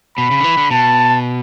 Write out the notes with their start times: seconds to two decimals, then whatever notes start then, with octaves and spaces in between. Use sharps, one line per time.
0.18 B2 B5
0.31 C#3
0.40 D3
0.44 E3
0.57 D3
0.71 B2 A5